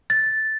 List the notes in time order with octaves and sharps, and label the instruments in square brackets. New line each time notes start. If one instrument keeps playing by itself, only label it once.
[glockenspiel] A6